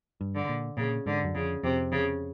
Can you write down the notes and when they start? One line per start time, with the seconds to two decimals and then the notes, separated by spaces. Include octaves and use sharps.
0.21 G2
0.35 D3
0.49 A#2
0.77 A#2 C#3
1.06 G#2 D3
1.24 F#2
1.35 F2 C#3
1.63 F2 C3
1.92 C#3